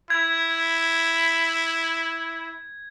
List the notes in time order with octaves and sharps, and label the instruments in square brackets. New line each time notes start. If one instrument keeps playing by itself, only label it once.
[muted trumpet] E4 [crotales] G#6